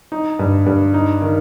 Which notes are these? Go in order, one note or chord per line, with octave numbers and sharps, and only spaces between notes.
D#4
G2
G2
D#4
D#3